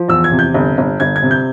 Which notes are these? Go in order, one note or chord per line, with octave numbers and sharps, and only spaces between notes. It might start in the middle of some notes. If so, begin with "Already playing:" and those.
Already playing: F3
E2 E6
G#6
C3
G6
G1
G1
G1 G#6
G#6
C3
G6